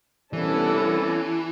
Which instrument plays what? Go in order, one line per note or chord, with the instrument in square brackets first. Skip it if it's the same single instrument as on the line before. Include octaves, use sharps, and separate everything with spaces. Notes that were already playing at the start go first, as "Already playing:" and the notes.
[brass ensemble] C2 D4 [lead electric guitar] E3 [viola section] B3 C#4 A5 [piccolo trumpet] A4